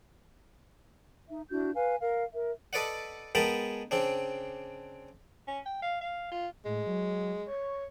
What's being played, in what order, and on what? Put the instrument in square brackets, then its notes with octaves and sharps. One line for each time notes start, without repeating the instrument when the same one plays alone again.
[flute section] D#4 E5
D4 E4 F#4 G6
B4 F5 G#5
A#4 F5
A#4 E5
[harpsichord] A4 B4 D5 D#5 F#5
G#3 B3 A#4 G5 A5 B5
C#3 C4 D4
[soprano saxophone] C#4
G5
F5
F5
F4
[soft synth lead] A2 [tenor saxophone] G#3
[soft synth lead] F#3
C#5